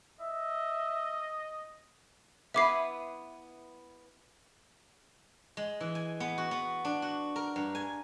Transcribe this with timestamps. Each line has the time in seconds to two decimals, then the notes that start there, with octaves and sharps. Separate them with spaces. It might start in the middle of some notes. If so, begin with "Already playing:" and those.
0.20 D#5 E5
2.54 B3 E4 B4 E5 D6 C7
5.57 G#3
5.81 E3
5.95 G#5
6.20 B3
6.38 F#4
6.51 B3
6.85 D4
7.02 F#4
7.36 A#4
7.56 G2
7.75 G#5